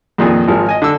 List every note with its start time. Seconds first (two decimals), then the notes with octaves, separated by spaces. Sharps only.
0.18 F2 A#2 D#3 G#4
0.48 G#1 F3 A#4
0.69 D#5 G#5
0.82 D3 E6